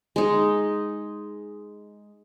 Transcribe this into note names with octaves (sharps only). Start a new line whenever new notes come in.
G#3 D#4